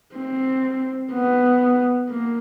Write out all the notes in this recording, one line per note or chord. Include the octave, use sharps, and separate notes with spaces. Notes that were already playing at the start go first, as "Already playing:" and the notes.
C4
B3
A#3